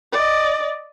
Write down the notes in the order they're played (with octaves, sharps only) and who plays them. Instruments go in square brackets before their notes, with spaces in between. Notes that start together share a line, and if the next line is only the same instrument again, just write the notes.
[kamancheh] D5 D#5